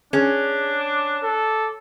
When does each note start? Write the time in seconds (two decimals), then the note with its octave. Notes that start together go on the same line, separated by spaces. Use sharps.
0.13 C#4 D4 G#4
0.81 D6
1.24 A4